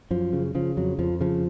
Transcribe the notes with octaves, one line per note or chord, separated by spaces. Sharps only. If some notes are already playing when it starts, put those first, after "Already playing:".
F#2 F3
C#3
C#3 F3
F2 F#3
F2 F3
C#3 F3